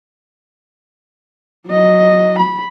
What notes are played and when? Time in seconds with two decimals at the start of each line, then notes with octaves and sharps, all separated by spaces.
1.67 F#3 D#5
2.39 B5